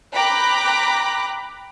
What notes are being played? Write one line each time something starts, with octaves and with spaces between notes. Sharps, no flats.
G5 A#5 B5 D6 F#6